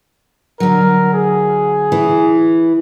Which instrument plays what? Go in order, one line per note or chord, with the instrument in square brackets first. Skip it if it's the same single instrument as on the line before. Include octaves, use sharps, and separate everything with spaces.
[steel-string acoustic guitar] D3 F#3 [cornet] A#4
[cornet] G#4
[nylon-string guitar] E3